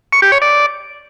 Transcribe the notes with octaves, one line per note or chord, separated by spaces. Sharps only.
C#6
G4
C#5
D5